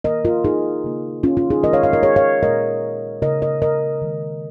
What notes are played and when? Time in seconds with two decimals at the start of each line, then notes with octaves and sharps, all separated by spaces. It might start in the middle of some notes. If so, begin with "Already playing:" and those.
0.04 D#3 A#3 A#4 D#5
0.25 F4 A#4
0.44 D#4 G#4
0.84 C#3 A#3
1.23 C#4 F4
1.37 C#4 F4
1.50 D#4 G#4
1.63 D#3 G#3 A#4 D#5
1.73 C#5 F5
1.83 C#5 F5
1.93 A#4 D#5
2.03 G#4 C#5
2.16 C#5 F5
2.43 A#2 G#3 A#4 D#5
3.22 C#3 A#3 A#4 D#5
3.42 A#4 D#5
3.62 A#4 D#5
4.02 D#3 G#3